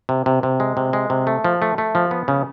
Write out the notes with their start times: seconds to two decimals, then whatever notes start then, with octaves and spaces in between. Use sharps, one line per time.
0.09 C3
0.26 C3
0.43 C3
0.60 G#3
0.77 C3
0.93 G#3
1.10 C3
1.27 A3
1.44 F3
1.62 A3
1.78 A3
1.95 F3
2.11 B3
2.28 C#3